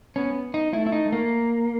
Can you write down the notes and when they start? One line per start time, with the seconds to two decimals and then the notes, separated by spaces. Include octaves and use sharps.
0.16 B3 C#4
0.54 D#4
0.73 A3 E4
0.87 E4
0.92 D#4
1.13 A#3